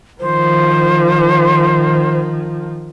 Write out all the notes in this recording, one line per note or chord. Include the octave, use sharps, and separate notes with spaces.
D#3 F3 C5